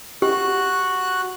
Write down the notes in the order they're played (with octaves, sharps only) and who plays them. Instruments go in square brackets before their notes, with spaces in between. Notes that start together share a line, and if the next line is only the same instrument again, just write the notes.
[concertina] F#4 F#6 [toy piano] G4